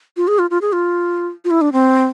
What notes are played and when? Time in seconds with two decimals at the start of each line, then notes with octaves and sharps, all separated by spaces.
0.17 F4
0.28 G#4
0.39 F4
0.50 F4
0.62 G#4
0.73 F4
1.45 F4
1.51 E4
1.61 D4
1.73 C4